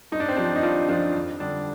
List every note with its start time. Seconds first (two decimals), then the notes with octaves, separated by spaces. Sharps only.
0.12 G2 D#4
0.20 D4
0.28 C4
0.37 F3 D4
0.56 D#4
0.63 G2 D4 F4
0.89 F3 D4 F4
1.14 F2
1.40 D3 G3 D4